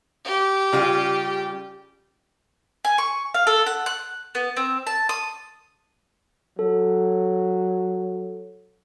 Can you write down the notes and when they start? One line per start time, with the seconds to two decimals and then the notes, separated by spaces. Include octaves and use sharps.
0.25 G4
0.73 C#3 G3 F4
2.85 G#5
2.98 C#6
3.34 F5
3.47 A4
3.66 F#5
3.86 F#6
4.35 B3
4.57 C4
4.87 A5
5.09 D#6
6.59 F#3 A4